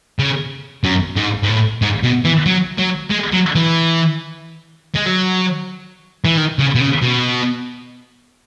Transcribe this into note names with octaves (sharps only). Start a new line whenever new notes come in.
C#3
F#2
G#2
G#2
A2
G#2
B2
E3
F#3
F#3
G#3
F#3
E3
G#3
F#3
E3
D#3
C#3
B2
C#3
B2